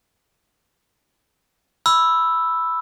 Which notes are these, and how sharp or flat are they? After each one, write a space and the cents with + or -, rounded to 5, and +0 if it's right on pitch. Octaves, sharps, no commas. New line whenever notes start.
B5 +0 E6 +0